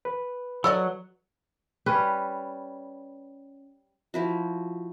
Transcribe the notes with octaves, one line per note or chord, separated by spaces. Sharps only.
B4
F#3 A4 D5 D#5
G3 C#4 B4
F3 E4 F#4